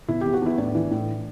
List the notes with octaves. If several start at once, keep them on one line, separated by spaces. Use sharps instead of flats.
B2 E4
E2 G4
F#4
E2 E4
A2 D4
E3
A2